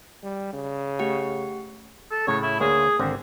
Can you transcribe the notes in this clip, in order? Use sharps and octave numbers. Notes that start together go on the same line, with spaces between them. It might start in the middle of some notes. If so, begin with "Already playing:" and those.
G3
C#3
A3 G4 F#5
A4
A2 C#3 C#5
E4
D2 A#3 G#4 C#5
G#1 D3 C4